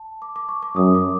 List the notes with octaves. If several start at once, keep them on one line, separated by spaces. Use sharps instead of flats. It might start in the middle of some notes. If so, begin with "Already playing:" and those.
Already playing: A5
D6
D6
C#6
D6
F#2 D#6
D6